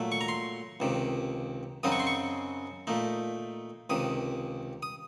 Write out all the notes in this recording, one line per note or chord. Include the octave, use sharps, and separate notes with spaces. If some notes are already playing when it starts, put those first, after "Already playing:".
Already playing: A#2 F#3 A3
C#6
A#5
C6
C#2 C3 D#3
F#2 C#3 F#3 C4 D#4 D#6
C#6
C6
C#6
A#2 A3 D#4
C#2 C3 D#3 D#6
D#6